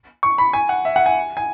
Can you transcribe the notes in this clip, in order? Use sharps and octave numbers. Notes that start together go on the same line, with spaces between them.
C#6
B5
G#5
F#5
E5
F#5
G#5
G#5